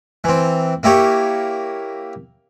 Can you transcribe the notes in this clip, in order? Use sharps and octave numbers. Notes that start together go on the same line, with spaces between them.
E3 C4
A#3 E4 G4 C#5